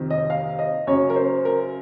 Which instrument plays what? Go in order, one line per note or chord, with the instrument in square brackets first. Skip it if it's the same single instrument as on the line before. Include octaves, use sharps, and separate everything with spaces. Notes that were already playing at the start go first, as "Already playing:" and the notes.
Already playing: [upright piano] F2 C3 D#3
D#5
F5
D#5
F#2 C#3 C#5
A#4
C5
A#4